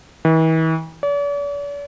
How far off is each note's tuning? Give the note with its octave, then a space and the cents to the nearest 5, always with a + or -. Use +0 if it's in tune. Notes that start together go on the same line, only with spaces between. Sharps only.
E3 -40
D5 -45